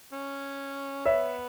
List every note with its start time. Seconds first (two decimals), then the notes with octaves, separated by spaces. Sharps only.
0.13 C#4
1.05 B3 C#5 E5